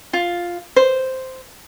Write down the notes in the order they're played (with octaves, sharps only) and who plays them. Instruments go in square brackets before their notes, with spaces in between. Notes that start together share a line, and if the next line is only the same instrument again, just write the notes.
[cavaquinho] F4
C5